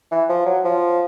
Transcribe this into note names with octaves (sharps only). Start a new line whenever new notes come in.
E3
F3
F#3
F3